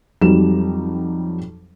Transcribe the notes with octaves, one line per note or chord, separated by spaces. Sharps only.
F2 F#3 G3 D#4 E7